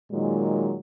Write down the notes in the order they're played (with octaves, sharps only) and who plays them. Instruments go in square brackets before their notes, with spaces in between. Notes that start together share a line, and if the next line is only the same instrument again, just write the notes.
[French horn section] A#2 D#3 F#3 G#3